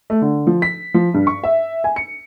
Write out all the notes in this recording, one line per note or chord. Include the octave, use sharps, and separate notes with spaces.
A3
D3
F3
B6
F3
G2
C#6
E5
G#5
C#7